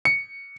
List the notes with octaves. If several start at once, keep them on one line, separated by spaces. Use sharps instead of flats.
C#7